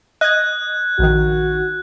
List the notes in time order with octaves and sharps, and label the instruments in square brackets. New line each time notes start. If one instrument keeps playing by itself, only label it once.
[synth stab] D#5 [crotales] F#6 G#6
[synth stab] A#1 D#3 [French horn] F#4